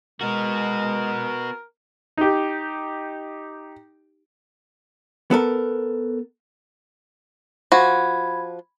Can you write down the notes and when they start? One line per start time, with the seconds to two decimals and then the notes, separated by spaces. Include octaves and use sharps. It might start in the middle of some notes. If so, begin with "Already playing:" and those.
0.21 G#3 B3 F#4 A#4
2.17 D#4 G4
5.31 B3 A4 A#4
7.72 F3 F#4 B5 G#6